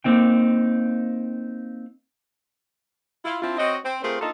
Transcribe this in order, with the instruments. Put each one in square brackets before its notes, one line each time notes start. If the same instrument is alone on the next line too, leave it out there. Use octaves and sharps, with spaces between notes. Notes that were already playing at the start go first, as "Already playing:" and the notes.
[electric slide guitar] A#3 C4 D#4 G5
[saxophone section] E4 F4
C4 D4 E4 F4
C4 F#4 C#5 D#5
C4
A3 C4 F4 G#4 A#4 C5
A#3 D4 D#4 F4 A4